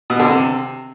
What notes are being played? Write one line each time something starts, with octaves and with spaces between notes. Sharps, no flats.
B2
D3
C3